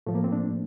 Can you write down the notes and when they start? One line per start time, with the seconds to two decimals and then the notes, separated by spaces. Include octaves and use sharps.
0.06 A2 F3 A3
0.15 A#3
0.24 C4
0.32 D4